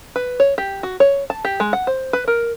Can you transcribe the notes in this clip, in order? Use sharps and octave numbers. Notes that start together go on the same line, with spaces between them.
B4
C#5
G4
F#4
C#5
A5
G4
G#3
F#5
C5
B4
A#4